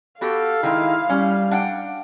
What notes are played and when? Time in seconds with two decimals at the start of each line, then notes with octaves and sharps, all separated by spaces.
0.21 B3 F#4 G4 A4 F5
0.63 D#3 G#3 E4
1.10 G3 C#4
1.51 D4 F#5 G5